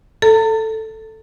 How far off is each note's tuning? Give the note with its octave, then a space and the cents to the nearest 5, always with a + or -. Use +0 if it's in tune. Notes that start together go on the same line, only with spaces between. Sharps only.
A4 +0 A#5 -45